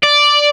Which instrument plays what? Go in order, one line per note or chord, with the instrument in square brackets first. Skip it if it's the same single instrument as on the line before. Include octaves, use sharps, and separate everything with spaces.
[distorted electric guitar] D5